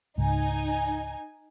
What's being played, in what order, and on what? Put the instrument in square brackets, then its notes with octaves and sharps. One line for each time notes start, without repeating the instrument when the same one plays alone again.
[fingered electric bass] C#2 G#2 [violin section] D#4 G#5